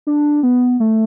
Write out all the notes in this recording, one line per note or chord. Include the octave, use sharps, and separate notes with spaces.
D4
B3
A3